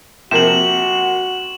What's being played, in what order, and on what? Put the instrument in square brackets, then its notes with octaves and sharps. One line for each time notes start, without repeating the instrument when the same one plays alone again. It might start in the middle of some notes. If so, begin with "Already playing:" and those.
[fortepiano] C3 F3 A#3 [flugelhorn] F#4 [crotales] E7 F#7